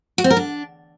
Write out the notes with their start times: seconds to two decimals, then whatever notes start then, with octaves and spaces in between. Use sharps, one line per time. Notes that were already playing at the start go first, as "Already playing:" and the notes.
0.18 F#4
0.24 C4
0.30 A#4
0.37 D4